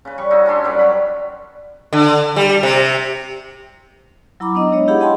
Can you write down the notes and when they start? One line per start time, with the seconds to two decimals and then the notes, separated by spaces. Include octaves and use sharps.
0.05 C#3 B4
0.18 G3 C#6
0.31 D#4 E4 F#4
0.46 C#4 D4 E4 C6
0.64 F#2 F#3 G3 B4
0.79 F#3 B5
1.93 D3
2.36 G3
2.63 C3
4.40 F#3 E4 A#5 B5 D6
4.55 B3 D4 D#4 D#5
4.72 G#3 D4 C#5 D#5
4.88 E4 G4 G#4 F5 F#5 B5
5.01 D#5 G5 A5 B5 C6